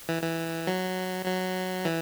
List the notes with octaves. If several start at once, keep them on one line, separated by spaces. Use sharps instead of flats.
E3
E3
F#3
F#3
E3